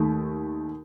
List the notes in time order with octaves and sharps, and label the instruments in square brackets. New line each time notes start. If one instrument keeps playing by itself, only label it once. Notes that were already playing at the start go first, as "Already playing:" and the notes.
Already playing: [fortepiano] D#2 D#3 A3